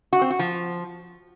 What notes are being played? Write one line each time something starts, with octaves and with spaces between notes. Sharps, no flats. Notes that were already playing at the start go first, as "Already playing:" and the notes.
F#4
C4
F#4
F3